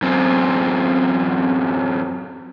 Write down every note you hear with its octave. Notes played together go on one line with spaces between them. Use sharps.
F#2 C4